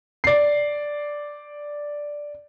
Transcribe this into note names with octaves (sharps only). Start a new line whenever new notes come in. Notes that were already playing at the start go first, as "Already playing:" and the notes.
D5 C7